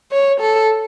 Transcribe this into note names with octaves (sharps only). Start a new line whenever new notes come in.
C#5
A4